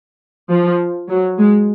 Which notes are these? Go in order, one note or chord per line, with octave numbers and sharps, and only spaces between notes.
F3
F#3
G#3